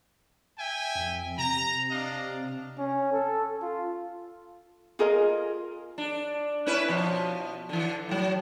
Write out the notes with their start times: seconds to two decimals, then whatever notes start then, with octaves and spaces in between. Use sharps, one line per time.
0.59 E5 G5 G#5
0.95 F2
1.38 C3 A#5
1.91 D4 D#5 F5
2.79 C#4
3.12 A4
3.62 F4
4.99 F4 G#4 A#4 D#5
5.98 D4
6.67 C#4 E4 B4
6.88 B2 F3
7.69 D3 E3
8.09 A2 F#3